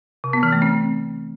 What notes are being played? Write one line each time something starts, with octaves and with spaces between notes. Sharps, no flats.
C3
B3
E3
A3
C4